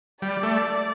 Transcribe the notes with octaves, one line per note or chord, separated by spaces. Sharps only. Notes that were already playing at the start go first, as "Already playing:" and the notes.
G3 D5
A3